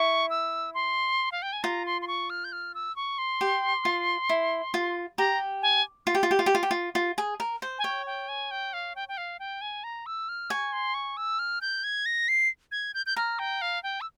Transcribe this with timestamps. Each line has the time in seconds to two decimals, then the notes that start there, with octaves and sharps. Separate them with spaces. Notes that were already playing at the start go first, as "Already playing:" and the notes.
Already playing: E4 C#6
0.30 E6
0.74 C6
1.32 F5
1.42 G5
1.53 G#5
1.63 F4 A#5
1.86 C6
2.02 C6
2.08 C#6
2.30 F6
2.45 G6
2.52 F6
2.75 E6
2.96 C#6
3.18 C6
3.41 G4
3.85 F4
4.29 E4
4.74 F4
5.18 G4 A#5
5.62 G#5
6.07 F4
6.15 G4
6.23 F4
6.31 G4
6.39 F4
6.46 G4
6.55 F4
6.63 G4
6.71 F4
6.95 F4
7.18 G#4
7.40 A#4
7.62 C5
7.79 G#5
7.84 C#5 G5
8.06 G5
8.28 G#5
8.51 G5
8.73 F5
8.96 G5
9.09 G5
9.17 F5
9.39 G5
9.61 G#5
9.84 A#5
10.06 E6
10.29 F6
10.50 G#5 C#6
10.73 C6
10.94 C#6
11.17 E6
11.39 F6
11.61 G6
11.84 G#6
12.06 A#6
12.28 C7
12.72 G#6
12.94 G6
13.06 G6
13.16 A#5 F6
13.39 G5
13.62 F5
13.83 G5
14.01 E6